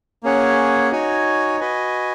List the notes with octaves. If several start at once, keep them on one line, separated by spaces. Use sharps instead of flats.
A#3 C#4 G#4 C#5 F#5
D#4 F#4 C#5 G#5
F#4 B4 D#5 G#5